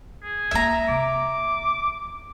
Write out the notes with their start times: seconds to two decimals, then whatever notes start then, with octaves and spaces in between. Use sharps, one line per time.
0.24 G#4
0.51 A#3 B3 E5 A#5
0.89 C3 D6